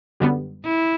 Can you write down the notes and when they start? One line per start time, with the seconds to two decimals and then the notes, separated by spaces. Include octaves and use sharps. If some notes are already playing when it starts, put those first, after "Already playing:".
0.20 F#2 D3 G3 B3
0.65 E4